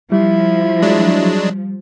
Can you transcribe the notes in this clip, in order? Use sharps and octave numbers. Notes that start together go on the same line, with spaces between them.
F3 G3 E4
F#3 G#3 D4